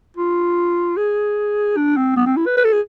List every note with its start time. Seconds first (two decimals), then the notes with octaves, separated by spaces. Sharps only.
0.17 F4
0.97 G#4
1.77 D4
1.97 C4
2.17 B3
2.26 C4
2.37 E4
2.46 B4
2.57 B4
2.64 A4
2.73 G#4